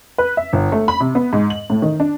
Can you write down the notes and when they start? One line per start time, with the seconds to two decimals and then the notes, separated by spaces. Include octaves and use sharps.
0.18 B4
0.37 E5
0.53 G1
0.72 A3
0.88 B5
1.00 C3
1.15 B3
1.33 G#2
1.50 F#7
1.70 A2
1.82 D#3
2.00 D4